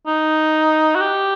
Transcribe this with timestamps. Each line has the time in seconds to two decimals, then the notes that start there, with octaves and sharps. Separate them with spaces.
0.07 D#4
0.95 F#4
1.01 G4